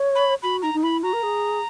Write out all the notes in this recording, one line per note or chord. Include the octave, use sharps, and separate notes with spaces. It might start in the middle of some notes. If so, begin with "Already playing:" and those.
Already playing: C#5
B5
F#4 B5
D#4 A#5
D#4
E4 B5
F#4 A#5
A#4
G#4